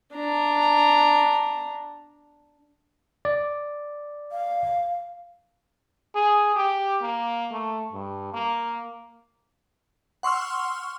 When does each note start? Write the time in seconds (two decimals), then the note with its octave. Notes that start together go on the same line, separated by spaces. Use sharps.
0.15 D4 A#5
3.25 D5
4.32 F5
6.15 G#4
6.56 G4
7.02 A#3
7.52 A3
7.93 G2
8.34 A#3
10.23 F#5 C6 C#6 E6 F6